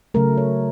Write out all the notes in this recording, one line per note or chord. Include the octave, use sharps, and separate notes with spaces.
C#3 F#3 A3 A#4
C#5